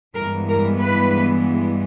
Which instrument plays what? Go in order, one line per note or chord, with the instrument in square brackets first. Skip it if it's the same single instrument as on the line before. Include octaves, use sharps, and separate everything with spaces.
[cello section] G2 E3 G#3 B3 A#4
A#4
B4